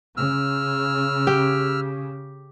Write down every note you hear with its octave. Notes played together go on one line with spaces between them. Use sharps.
C#3 E6 F6
G4